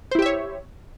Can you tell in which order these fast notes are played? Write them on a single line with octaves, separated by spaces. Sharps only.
C5 E4 G4 E5 C#5